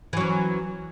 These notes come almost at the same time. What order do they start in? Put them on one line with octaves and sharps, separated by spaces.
E3 F#3 C#4